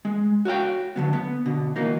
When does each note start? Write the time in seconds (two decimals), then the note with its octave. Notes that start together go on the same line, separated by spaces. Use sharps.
0.05 G#3
0.45 F#4 C#5 F5 G5
0.96 D3 F#3 B3
1.13 B3
1.46 B2 D3
1.76 E3 F#3 A#3 D#4